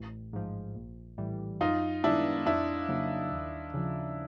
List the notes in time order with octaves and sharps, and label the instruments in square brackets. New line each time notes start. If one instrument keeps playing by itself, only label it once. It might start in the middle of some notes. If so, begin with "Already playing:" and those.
Already playing: [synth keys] A1
G#2 F3
A#1
A2 E3 G3
[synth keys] F#2 [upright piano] D#4 F4
[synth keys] D#3 G#3 B3 [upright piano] D4 E4
[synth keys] F2 [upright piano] D4 E4
[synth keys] C#3 F#3 A#3 D#4
D#2
C#3 F3